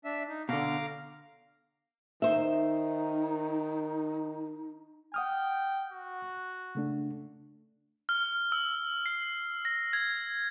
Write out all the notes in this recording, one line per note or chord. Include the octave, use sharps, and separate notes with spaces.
D4 E5
D#4
B2 D3 F5 A#5 D6
D#3 D#4 C5 E5
F#5 G5 D#6 F6
F#4
C#3 A3 D4
F6
E6
C7
A#6
G#6